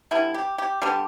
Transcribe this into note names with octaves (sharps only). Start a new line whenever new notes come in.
D3 G3 B3 E4
G4
G4
D3 G3 B3 G4